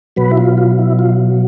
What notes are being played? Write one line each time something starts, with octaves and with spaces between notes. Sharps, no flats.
B2 F#3 B4
E4
F4
F4
E4
F4